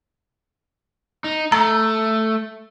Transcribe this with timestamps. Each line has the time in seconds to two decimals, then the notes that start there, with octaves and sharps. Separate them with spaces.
1.24 D#4
1.52 A3 A#5